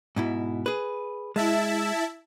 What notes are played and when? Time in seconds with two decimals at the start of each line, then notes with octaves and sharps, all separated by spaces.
0.16 G#2 B2 E4
0.66 G#4 B4
1.36 G#3 E4 E5 A5